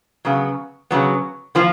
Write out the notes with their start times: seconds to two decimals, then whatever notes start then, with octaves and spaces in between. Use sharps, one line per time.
0.25 C#3 F#3 B3
0.91 C#3 F#3 B3
1.55 F3 A#3 F4